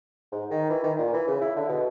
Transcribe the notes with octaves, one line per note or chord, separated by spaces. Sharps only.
G#2
D#3
E3
D#3
A#2
E3
C#3
E4
D3
B2